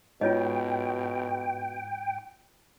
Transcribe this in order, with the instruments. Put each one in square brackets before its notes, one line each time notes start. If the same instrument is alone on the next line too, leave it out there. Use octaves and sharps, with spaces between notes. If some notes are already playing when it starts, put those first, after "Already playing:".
[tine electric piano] G#2 [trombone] B2 [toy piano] F4 C#5 D#5 [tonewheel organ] G5